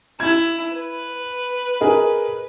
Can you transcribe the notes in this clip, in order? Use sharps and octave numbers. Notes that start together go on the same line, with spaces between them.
E4 G#6
B4
G#4 A#4 D#5